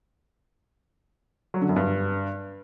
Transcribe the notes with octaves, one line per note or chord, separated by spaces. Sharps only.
F#3
D3
F#2
G2